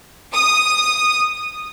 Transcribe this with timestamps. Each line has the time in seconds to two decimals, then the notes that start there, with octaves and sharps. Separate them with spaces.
0.32 D#6